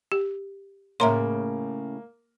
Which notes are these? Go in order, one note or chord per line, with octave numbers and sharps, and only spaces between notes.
G4
A2 C#3 A#3 C#4 E5 A#5 C6